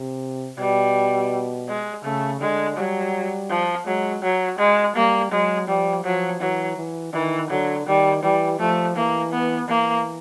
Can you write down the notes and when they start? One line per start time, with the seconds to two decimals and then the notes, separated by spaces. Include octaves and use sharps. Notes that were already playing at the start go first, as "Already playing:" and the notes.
Already playing: C3
0.58 B2 G3
1.68 G#3
2.04 C#3 A3
2.41 D3 G#3
2.77 F#3 G3
3.50 F3
3.86 F#3 G#3
4.23 F#3
4.59 G#3
4.96 G3 A#3
5.32 F#3 G#3
5.68 F3 G3
6.04 F3 F#3
6.41 E3 F#3
6.77 E3
7.14 D#3 E3
7.51 D3 F#3
7.87 D#3 G3
8.23 E3 G3
8.60 F3 A3
8.96 E3 A#3
9.33 B3
9.68 E3 A#3